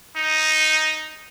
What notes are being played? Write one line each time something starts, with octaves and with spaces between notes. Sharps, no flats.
D#4